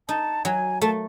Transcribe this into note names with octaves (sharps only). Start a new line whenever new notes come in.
D#4 A5
F#3 G#5
A3 A5